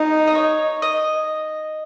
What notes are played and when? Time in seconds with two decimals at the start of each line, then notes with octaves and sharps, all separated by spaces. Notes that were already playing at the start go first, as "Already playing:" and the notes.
Already playing: D#4
0.28 D#5
0.35 C#5
0.82 D#5